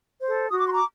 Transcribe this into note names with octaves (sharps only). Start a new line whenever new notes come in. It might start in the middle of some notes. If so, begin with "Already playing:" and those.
A4 C5
F#4 D#6
D6
C6
A#5 D6